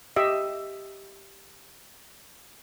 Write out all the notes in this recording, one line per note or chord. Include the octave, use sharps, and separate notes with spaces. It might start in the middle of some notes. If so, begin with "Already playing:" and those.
G4 D#5 E5